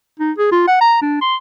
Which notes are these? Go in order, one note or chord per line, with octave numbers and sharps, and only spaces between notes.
D#4
G#4
F4
F#5
A#5
D4
C6